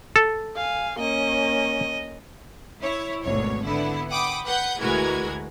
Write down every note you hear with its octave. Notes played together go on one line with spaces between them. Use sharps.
A4
F5 G#5
A#3 C#4 D#5
E4 C#5
G#1 D2 B2 C#5
D3 B3 E4
F#5 G5 B5 D6 D#6
B4 F#5 G6
D2 E3 G#3 F#4 A#4 G#6